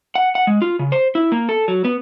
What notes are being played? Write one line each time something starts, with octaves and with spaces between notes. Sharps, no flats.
F#5
F#5
G#3
F4
C#3
C5
E4
A#3
A4
F#3
B3